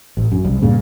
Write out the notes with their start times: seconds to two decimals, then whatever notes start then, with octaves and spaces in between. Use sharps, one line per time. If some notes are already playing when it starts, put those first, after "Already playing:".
0.17 A1
0.32 F#2
0.44 C2
0.62 C#2 G2 A#2 C#3